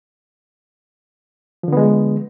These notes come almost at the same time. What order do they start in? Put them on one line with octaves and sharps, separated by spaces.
F3 D3 B3 G#3